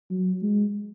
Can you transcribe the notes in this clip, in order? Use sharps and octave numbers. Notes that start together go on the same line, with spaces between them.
F#3
G#3